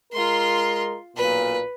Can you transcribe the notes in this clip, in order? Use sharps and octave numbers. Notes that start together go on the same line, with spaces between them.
G#3 F4 A#4 C6
B1 A#2 B4